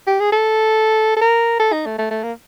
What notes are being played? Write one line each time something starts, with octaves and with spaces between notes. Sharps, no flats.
G4
G#4
A4
A4
A#4
A4
D#4
A3
A3
A3
A#3